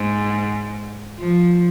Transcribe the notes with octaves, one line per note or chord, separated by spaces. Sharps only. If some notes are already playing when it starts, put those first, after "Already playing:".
Already playing: G#2
F3